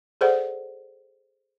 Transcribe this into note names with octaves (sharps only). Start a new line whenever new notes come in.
G#4 A4 C5 D5 F#5